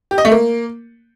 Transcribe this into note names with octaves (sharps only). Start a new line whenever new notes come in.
G4
D#5
A3
A#3